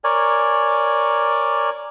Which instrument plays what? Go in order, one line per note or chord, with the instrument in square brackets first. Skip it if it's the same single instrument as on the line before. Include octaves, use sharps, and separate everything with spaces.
[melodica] A#4 C#5 D5 G#5